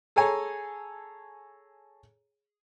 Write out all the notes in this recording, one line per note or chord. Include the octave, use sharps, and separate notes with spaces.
G#4 A4 C#5 G#5 A#5